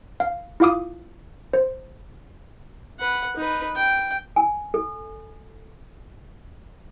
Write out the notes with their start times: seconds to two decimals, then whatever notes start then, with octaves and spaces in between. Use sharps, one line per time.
0.20 F5
0.60 E4 F4 F5 D6 D#6
1.53 C5
2.99 B4 F#5
3.36 D#4 B4
3.76 G5
4.36 G#5
4.74 A4